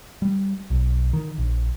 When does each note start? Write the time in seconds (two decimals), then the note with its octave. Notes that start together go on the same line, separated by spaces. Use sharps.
0.22 G3
0.70 B1
1.13 D#3
1.38 A#1